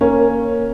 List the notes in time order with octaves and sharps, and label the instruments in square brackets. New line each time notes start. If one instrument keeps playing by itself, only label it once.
[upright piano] A#3 [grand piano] C#4